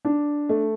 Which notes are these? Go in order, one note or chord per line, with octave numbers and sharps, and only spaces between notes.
D4
A3